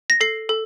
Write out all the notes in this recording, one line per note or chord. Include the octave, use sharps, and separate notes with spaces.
A#6
A4 C7
A4